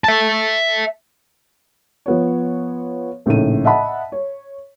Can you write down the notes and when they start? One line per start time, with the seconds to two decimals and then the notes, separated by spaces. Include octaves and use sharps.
0.04 E5 A5
2.06 F3 B3 C#5
3.26 A#1 A2 C#3 D#4 A4 D#7
3.64 D#5 E5 F#5 A5 B5
4.12 C#5